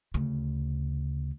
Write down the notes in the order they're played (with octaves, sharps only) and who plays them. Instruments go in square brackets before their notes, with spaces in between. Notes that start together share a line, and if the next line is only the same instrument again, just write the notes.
[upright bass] D2 C#3